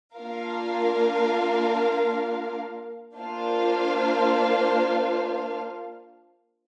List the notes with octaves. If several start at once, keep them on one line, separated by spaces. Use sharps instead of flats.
A#3 D4 F4 A#4 F5
A#3 D4 F4 C5 F5